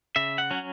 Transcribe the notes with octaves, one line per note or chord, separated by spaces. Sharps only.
C#3 E5
F#5
F#3 C#4